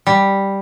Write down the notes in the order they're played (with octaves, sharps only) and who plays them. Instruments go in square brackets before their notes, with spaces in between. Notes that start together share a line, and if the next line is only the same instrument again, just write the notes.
[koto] G3